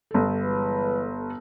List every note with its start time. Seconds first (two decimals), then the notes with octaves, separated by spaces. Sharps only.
0.11 G1 A4
0.43 E3 G#3 B4